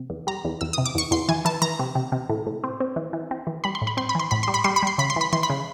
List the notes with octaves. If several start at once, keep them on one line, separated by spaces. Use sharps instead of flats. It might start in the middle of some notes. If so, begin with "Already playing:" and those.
Already playing: C3
E2
G3 A#5
E2
E2 E6
C3 D#6
D6
E2 C#6
E2 C6
E3 G#5
E3 A5
E3 A#5
C3
C3
C3
A2
A2
C4
C4
E3
E3
C4
E3
G3 B5
C6
A2
B5
C4 C6
B5
E3 C6
A2 B5
G3 C6
B5
G3 C6
B5
G3 C6
C#3 B5
C6
E3 B5
E3 C6
B5
C#3